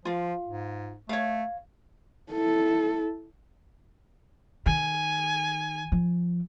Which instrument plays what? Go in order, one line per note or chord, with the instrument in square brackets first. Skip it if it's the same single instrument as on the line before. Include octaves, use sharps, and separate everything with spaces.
[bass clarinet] F3 [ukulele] F4 F5
[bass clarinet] G#2
[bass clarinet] A3 [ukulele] C#5 F5
[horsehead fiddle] E4 A4
[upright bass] D#3 [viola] G#5
[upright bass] F3